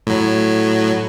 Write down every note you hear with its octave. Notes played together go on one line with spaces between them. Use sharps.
A2 F#3